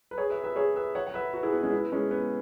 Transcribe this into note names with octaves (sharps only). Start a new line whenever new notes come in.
B4
G#4 C#5
B4 E5
B4 E5
G#4 C#5
B4 E5
C#5 F#5
F#5
B4 E5
F#4 B4
E4 G#4
B3
G#3 C#4
B3 E4
G#3 C#4
B3